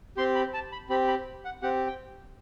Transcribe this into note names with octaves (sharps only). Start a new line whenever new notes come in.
C4 G4 C6
B5
A5
B5
C4 G4 B5
B5
F#5
C4 G4 F#5
G5